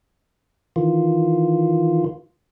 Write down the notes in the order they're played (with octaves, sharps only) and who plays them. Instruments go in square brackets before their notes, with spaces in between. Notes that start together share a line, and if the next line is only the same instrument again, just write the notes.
[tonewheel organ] D#3 E3 F4